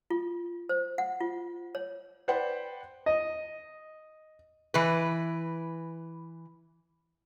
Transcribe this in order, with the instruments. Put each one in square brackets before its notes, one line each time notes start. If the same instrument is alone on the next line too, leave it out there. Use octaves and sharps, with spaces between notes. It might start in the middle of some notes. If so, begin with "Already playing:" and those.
[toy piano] F4
C5
F#5
F4
C#5
[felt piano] B4 C5 D5 F#5 G5
[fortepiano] D#5
[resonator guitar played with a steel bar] E3 B4